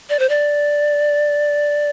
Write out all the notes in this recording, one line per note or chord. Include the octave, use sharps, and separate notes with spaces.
D5
C5
D5